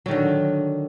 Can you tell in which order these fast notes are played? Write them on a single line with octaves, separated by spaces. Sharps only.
F#3 D#3 D3